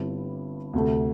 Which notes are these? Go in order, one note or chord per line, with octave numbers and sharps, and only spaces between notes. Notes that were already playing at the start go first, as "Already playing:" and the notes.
Already playing: G1 G2 G3 C4 E4
D2 C3 A3